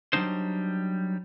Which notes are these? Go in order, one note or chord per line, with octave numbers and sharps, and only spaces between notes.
F#3 G3 A#3 D4 D#4 C5